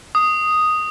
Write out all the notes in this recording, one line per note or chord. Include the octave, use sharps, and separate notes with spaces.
D#6